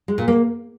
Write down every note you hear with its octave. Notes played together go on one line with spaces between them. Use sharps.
G#3
A#2
A#3